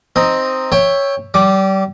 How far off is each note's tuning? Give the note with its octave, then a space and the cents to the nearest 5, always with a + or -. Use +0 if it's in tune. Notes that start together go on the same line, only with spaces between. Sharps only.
C4 +0 D#4 +0
C#5 +0 E5 +0 G5 +20
G3 -30 D6 +0